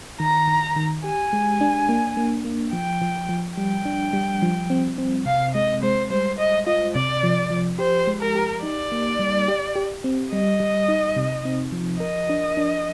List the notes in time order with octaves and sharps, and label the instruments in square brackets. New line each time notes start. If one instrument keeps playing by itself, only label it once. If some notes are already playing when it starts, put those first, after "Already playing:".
[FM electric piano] D#3 [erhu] A#5
[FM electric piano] D#3
D#3
[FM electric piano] G4 [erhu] G#5
[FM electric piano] G#3
D4
A#3
A#3
A#3
[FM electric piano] F3 [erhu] G5
[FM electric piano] F3
F3
[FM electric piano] G3 [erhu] G5
[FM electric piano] D4
G3
F3
C4
C4
[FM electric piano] C3 [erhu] F5
[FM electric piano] G#3 [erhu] D#5
[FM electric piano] G#3 [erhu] C5
[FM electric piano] G3 [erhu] C5
[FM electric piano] C5 [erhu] D#5
[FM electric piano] F4 [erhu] D#5
[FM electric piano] C3 [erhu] D5
[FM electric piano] F3
F3
[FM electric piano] G4 [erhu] C5
[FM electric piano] G#3
[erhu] A#4
[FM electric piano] G4
[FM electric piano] D#4 [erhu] D5
[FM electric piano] A#3
G3
G4
G4
C4
[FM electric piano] G3 [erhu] D#5
[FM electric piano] G3
D#4
C3
C4
F3
[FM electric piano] A#4 [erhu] D#5
[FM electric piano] D4
D4